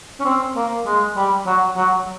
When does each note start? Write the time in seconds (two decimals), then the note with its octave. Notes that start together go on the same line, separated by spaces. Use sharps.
0.20 C#4
0.25 C4
0.56 A#3
0.86 G#3
1.16 G3
1.46 F#3
1.76 F#3